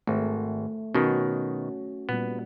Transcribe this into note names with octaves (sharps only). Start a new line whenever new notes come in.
G#1 A3
B2 D#3 C#4 F#4
A#2 G3 B3